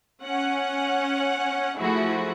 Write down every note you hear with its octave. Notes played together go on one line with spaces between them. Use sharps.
C#4 F#5
F3 A3 E4 F#4 G#4